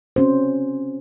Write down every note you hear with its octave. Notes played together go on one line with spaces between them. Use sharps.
C4 C#4 F#4 C5